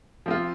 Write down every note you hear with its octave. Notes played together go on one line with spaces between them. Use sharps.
F3 C4 F4